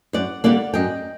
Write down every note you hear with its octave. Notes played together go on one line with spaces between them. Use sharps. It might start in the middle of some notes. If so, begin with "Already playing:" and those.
F#2 D5 F#5
D3 G3 A#3 D5 F#5
F#2 D#5 G5